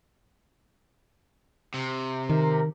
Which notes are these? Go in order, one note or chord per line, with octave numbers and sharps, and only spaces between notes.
C3
D#3 A#4